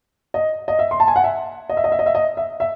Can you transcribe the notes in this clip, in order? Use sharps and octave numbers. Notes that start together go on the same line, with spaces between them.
D#5
D#5
E5
C6
A5
G#5
F#5
E5
D#5
E5
D#5
E5
D#5
E5
D#5
E5
E5